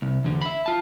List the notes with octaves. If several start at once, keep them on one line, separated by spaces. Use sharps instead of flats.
C2
E2 D3
E5 B5
F4 A5